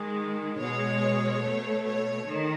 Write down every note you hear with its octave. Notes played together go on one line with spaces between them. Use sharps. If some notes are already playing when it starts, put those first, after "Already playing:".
Already playing: D#3 G#3
B2 G#3 C#5
B2 A3
C#5
D#3